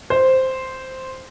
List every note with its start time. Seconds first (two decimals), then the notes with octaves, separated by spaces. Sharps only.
0.10 C5